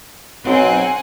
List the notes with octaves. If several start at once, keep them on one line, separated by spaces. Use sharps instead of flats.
B1 F#3 C4 F#5 G#5